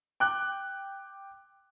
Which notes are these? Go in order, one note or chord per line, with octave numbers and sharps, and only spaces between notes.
G5 D6 F#6